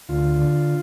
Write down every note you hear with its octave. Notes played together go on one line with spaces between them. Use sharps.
D2 F4
D3